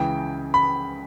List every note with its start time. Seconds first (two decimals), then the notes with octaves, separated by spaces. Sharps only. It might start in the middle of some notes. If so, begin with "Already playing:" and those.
Already playing: C#2 C#3 E3 G5
0.54 B5